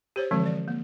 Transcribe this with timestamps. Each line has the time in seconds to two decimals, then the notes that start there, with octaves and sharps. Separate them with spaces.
0.16 G4 C5 C#5
0.31 D3 E3 F3 G#3 C4
0.46 D5
0.68 A#3